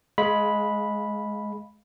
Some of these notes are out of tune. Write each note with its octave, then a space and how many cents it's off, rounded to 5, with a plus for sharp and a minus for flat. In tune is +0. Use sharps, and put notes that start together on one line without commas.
G#3 +15 F5 +0 B5 -5